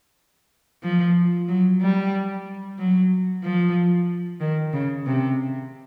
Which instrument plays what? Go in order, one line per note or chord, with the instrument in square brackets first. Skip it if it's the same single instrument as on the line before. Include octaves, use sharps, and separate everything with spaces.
[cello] F3
F#3
G3
F#3
F3
D#3
C#3
C3